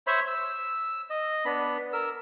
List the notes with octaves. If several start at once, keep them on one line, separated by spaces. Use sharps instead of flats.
C5 C#5 E5 B5
E6
D#5
B3 D4 B5
A#4 E6